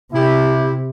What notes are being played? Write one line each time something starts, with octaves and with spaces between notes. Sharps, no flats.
C3 E4 G4